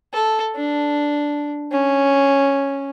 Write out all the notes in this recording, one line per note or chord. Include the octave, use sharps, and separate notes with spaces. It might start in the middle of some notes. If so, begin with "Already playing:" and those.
A4
D4
C#4